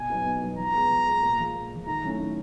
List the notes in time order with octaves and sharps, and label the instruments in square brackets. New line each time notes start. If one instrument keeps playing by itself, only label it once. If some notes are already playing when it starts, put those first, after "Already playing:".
Already playing: [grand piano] B2 [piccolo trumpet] G#5
[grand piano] F#3 B3 D#4 F#4
B2
F#3 B3 D#4 F#4
[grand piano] F3 [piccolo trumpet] A#5
[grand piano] G#3 B3
F3
G#3 B3
A#2
F3 G#3
A#2
F3 G#3
[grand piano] D#3 [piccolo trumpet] A#5
[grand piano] F#3 A3 C#4 E4
D#3